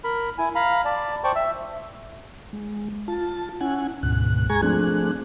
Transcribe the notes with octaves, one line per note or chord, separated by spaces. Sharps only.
A#4 B5
E4 G#5
F5 A#5 B5
D5 A5
C5 D5 G5 A5 C#6
E5 E6
G#3
F4 A5
C#4 E4 F#5 G#5
D2 G#2 B2 F#6
G#3 G#4 G#5 A#5 C#6 G#6
F3 A3 C4 D4 G#4 F#6